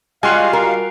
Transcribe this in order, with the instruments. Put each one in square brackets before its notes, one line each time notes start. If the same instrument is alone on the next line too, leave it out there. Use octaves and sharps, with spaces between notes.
[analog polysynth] G3 F4 F#4 [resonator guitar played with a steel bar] G#3 [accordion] F5 [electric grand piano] G#5 C6 F#6
[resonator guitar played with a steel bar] A#4